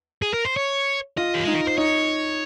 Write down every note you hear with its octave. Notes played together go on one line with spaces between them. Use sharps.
G#4
A#4
C5
C#5
F4 D#5
G4
D#4 G#4
A#4
C5
D#4 C#5